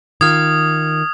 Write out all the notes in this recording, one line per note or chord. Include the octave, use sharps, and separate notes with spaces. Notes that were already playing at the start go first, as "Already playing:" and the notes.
D#3 F4 D#6 F6 G#6